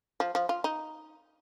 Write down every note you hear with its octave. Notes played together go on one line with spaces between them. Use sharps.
F3
F3
F4
D#4